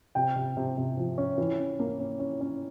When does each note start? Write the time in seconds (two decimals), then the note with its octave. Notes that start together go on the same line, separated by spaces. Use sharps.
0.15 C3 G5
0.36 C3
0.57 C3
0.77 C3
0.97 F3
1.18 C#4
1.38 E3
1.58 C#4
1.80 A#3
2.00 C#4
2.20 C#4
2.41 C#4